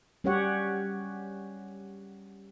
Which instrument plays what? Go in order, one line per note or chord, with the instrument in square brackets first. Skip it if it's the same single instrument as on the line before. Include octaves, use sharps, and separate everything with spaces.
[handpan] G3 C#4 F#4 G4 C#5 F#5